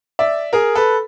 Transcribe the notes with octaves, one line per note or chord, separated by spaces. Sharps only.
D5 E5
G#4 A#4
A4 B4